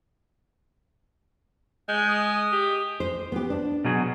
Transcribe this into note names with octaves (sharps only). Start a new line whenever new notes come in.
G#3 G6
D#6
G4
C5
B3 G4
D4
B2 F#3 G#4